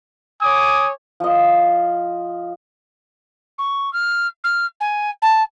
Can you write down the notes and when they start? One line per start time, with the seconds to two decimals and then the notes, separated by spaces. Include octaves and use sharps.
0.42 C#5 G#5 D6 D#6
1.20 F3 D#5
3.58 C#6
3.93 F6
4.44 F6
4.80 G#5
5.22 A5